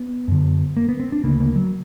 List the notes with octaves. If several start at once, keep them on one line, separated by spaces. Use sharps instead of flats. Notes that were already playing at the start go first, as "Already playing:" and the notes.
Already playing: B3
F#2 D3
A#3
B3
C4
D4
D2 C#3 A#3
A#3
F#3